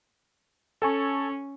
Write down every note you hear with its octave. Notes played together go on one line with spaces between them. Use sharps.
C#4 A4 G#5 C#6